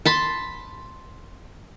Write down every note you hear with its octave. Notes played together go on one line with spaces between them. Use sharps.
A5 B5 C6